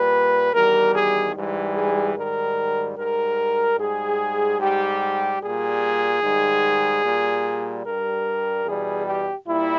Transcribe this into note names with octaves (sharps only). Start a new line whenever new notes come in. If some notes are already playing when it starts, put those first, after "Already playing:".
Already playing: A#2 G3 B4
E2 D#3 G3 A#4
G#4
G#2 E3 G3
G#4
G#2 D#3 G3 A#4
G#2 G3 A#4
G#2 G3 G#4
G#2 G3 G4
A#2 G3 G#4
G#2 D#3 G3
A#2 G3
G2 G3 A#4
E2 B2 G3 G#4
G4
A#2 G3 E4